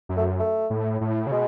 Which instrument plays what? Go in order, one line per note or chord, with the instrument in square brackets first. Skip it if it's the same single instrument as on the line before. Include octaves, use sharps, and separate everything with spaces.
[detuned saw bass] F#2
[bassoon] A3
A3
[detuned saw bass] A2
A2
C#3
[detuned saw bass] B2 [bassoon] G#3